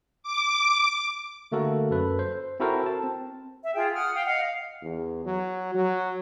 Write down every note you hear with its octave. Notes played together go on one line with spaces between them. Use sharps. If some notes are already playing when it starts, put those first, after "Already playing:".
D6
D3 A3 A#3 F#4 A4 A#4
F#2 A4 B4
C5
C4 E4 F#4 A4 A#4 C5
A5
C4
E5
F4 G#4 G5
F#5 D#6 F6
F5 G5
D#5 F5 F#5
E2
F#3
F#3